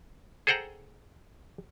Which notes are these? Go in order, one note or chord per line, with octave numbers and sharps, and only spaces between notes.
G#4 A4 C5 F#5 G5 A#5